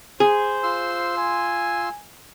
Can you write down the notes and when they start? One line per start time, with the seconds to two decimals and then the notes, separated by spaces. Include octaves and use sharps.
0.20 G#4 C5
0.63 F4 C6 E6
1.17 G#5